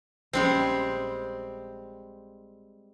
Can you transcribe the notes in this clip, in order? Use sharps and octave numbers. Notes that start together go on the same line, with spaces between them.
A#1 G3 G#3 C4 C#4